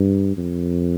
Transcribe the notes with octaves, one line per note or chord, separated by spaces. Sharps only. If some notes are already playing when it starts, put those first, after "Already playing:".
Already playing: G2
F2